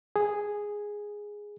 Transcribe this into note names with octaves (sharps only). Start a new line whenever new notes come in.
G#4